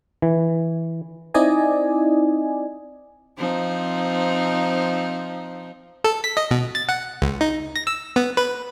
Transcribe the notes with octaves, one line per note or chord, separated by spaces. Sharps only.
E3
C4 D#4 E4 D5 D#5 G#5
F3 C4 D#4
A4
B6
D#5
B2
A6
F#5
C#2
D#4
A#6
E6
B3
B4